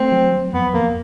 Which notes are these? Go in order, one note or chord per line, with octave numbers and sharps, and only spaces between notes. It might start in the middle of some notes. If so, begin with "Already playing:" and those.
Already playing: A3 C4
F#3
F#3
F2 B3
F2 A#3